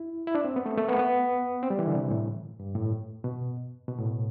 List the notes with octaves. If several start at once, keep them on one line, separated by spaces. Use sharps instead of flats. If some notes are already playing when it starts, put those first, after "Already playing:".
Already playing: E4
E4
D4
C4
B3
A3
A3
B3
B3
C4
G3
E3
D3
C3
A2
G2
A2
B2
B2
A2